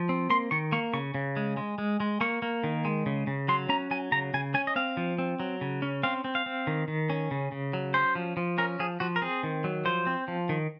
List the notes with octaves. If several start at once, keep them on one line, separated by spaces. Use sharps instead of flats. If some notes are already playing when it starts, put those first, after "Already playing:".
Already playing: F3
C4
A#3 C6
D#3 C#6
A#3 C#6
C#3 C#6
C#3
G#3
G#3
G#3
G#3
A#3 C#6
A#3
D#3
G#3
C#3
C#3
F#3 C6
C#4 A#5
F#3 G#5
C#3 A#5
C#3 G#5
C#4 G#5
D#5
C4 F5
F3
C4
F#3
C#3
C#4
C4 F5
C4
F5
C4
D#3
D#3
C#4
C#3
C#3
F#3
C#4 C5
F3
F3
C#4 A#4
F3 G#4
F3 F#4
A#4
C4 G#4
D#3
F#3
F3 C5
C4
F3
D#3